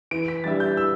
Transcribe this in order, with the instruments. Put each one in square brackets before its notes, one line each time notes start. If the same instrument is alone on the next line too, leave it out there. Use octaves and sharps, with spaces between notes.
[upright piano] E3 [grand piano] D7
[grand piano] B6
[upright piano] G3 D4 G4 E5 [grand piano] A6
[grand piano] G6
[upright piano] E3 [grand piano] E6